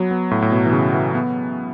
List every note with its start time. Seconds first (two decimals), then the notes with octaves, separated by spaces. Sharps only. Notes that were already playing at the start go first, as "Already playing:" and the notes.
Already playing: F#3 B3
0.11 B3
0.31 A2
0.42 A2
0.52 B2
0.66 E3
0.73 C#3
0.94 E3
1.14 B3